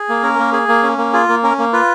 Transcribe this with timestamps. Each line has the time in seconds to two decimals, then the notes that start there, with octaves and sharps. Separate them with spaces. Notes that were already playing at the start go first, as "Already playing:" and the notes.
Already playing: G#4
0.09 A#3
0.23 C#4 A#4
0.39 A#3
0.53 G#4
0.68 A#3
0.83 C#4
0.98 A#3
1.13 F4 G#4
1.29 A#3
1.43 C#4 A#4
1.59 A#3
1.73 F4 B4